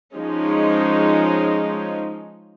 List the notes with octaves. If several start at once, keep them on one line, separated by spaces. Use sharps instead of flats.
F3 G#3 C#4 D#4